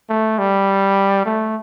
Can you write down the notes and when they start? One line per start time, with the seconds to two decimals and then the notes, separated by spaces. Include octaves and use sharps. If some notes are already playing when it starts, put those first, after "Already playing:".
0.09 A3
0.38 G3
1.25 A3